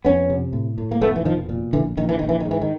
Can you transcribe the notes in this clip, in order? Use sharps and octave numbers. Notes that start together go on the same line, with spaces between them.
F2 B3 C#4
C3
A2
A2
A#3
F1 A3 B3
E3
B2 D#3 F3
A#2
A#1 D3 E3
A#1 D#3
E3
A#1 D#3
E3
G#2 D#3
E3
D#3